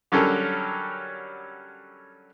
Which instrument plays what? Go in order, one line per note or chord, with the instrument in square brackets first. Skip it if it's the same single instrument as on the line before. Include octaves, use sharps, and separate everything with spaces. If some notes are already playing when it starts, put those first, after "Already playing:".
[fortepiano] D3 F#3 G3 C#4 A4 A#4